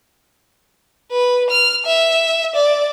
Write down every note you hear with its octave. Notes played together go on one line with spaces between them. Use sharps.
B4
F6
E5
D5